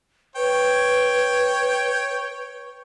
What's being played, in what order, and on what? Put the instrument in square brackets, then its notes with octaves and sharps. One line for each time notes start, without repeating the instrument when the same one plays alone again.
[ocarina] B4 [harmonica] C#5 G5